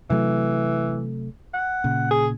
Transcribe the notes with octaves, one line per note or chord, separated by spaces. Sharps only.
C3 E3 F#3 A3
F#5
A#2 C#3
G#4